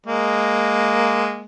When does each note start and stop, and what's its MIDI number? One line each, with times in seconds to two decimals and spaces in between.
0.06 1.45 56
0.06 1.45 58